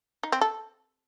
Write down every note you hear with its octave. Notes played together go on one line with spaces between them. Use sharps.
D#4
C4
A4